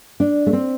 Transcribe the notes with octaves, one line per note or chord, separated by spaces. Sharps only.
D4
A3
C4